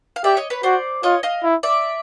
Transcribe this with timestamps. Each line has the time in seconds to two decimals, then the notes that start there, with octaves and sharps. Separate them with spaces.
0.16 F5
0.24 G4 D5 E5
0.37 C#5 D#5
0.50 B4 C#5
0.63 F#4 C5 D5
1.03 F4 C#5 D#5
1.23 D#5 F5
1.43 E4
1.63 D5 E5